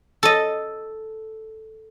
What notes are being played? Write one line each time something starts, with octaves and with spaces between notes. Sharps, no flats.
A4 D#5